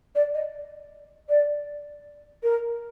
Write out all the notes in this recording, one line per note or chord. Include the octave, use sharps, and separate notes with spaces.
D5
D#5
D5
A#4